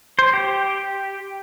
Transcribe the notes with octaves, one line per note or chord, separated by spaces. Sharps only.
C5
G4